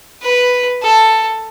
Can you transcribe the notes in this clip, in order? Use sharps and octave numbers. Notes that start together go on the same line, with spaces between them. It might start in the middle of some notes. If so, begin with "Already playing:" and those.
B4
A4